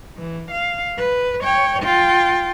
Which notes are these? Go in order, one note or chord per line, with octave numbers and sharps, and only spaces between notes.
E3
F5
B4
C#5 G5
F4 G5